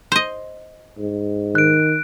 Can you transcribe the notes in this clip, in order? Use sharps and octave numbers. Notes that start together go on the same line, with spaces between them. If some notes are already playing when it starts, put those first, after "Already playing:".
C5 D#5
G#2
D#3 F#6 D7